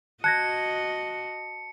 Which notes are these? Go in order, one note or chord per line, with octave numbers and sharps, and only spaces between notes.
F#4 D#5 A5 F#6 G#6 A#6 C#7